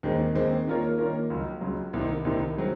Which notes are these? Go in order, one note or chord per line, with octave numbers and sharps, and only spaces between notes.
D#2 D#3 G#3 C4
D#2 D#3 G#3 C4
D#3 A#3 F4 A#4 C#5
D#3 A#3 F4 A#4 C#5
C#2 C#3 F#3
C#2 C#3 F#3
C2 C3 D#3
C2 C3 D#3
C#3 F#3 C4